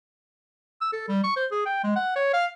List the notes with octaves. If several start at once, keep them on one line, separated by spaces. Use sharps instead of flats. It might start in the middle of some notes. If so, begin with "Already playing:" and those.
E6
A4
G3
C#6
C5
G#4
G5
G#3
F#5
C#5
F5